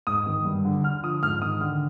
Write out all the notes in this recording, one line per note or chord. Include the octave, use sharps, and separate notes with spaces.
G#2 D#6
D#3
G2
D3
D3 F6
F3 D#6
G#2 F6
D#3 D#6
D3 F6